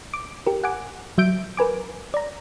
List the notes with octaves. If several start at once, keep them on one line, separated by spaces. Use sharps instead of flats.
D6
G4 A#4
F#5 G#5 D6
F#3 E5 G6 D7
A#4 B4 G#5 D6
D5 A#5